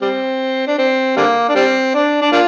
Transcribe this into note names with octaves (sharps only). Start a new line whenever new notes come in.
G3 C4
D4
C4
D3 G3 A#3
D4
G3 C4
D4
D4
A#3 D4 F4